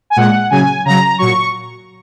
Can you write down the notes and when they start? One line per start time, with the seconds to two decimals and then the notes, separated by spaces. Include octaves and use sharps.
0.10 G#5
0.16 A#2 G#3 F#5
0.50 C#3 F#3 G#5
0.85 C#3 F#3 A#5
1.18 A#2 F#3 C#6